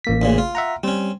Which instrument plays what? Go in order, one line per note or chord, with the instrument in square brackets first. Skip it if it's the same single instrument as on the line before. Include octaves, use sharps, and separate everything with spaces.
[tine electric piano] A1 A#3 B6
[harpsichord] D2 A#2 C#3
F4
[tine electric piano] E5 F#5 A#5
[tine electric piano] G3 [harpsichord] C4 C#4